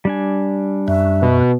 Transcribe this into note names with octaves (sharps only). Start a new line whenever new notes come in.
G3 D4 G#5
F#2 E5
B2